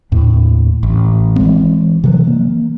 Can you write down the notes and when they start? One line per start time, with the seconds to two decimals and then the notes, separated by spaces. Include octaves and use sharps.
0.12 D#2 A2
0.83 A1
1.36 E3 G#3 C4
2.04 C3 E3 F#3
2.27 A#3